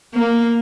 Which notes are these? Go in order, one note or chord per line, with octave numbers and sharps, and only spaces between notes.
A#3